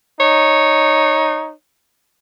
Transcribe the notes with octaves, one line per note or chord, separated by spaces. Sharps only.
D#4 C#5